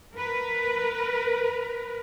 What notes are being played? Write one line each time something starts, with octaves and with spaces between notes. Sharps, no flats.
A#4 B4